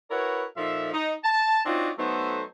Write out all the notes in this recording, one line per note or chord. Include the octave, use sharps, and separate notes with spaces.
E4 F#4 A#4 B4 C#5
A#2 F3 D#4 A4 E5
D#4
A5
C4 D4 D#4 F4 F#4 C#5
F#3 A3 B3 D#4 A4 C5